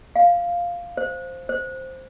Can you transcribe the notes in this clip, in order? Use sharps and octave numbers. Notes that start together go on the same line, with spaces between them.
F5
C5
C5